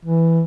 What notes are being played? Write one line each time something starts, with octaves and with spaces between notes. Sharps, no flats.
E3